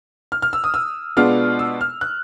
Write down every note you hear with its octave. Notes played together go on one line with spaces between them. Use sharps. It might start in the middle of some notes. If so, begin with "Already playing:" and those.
F6
F6
E6
D#6
E6
B2 G#3 B3 D4 F4 F6
E6
F6
F#6